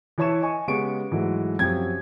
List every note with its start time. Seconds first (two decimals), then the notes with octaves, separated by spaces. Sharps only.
0.18 E3 E4 C#5 A5 C#6 E7
0.42 D#5 G#5 C#6
0.67 C#3 G#3 B3 G4 C#6 D7
1.11 G#2 E3 F#3 G#3 A3
1.59 F#2 C3 F3 G5 G#6